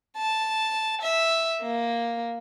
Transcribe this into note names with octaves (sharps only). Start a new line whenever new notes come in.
A5
E5
A#3